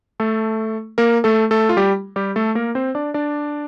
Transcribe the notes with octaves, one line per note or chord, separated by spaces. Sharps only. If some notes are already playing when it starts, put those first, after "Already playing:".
A3 A4
A#3 A#4
A3 A4
A3 A4
F4
G3 G4
G3 G4
A3 A4
A#3 A#4
C4 C5
D4 D5
D4 D5